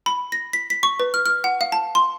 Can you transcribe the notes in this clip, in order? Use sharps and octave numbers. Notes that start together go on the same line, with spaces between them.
B5
A#6
B6
B6
C#6
B4
F6
F6
F#5
F5
A5
C6